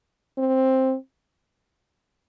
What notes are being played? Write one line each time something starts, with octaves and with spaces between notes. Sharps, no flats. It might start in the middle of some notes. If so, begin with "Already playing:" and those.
C4